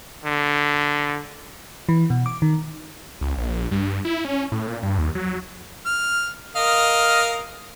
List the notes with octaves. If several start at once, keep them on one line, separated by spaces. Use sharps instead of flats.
D3
E3
B2
D6
D#3
C#2
A#1
G2
E4
C#4
A2
A#2
G2
D#2
F#3
F6
A#4 D#5 F5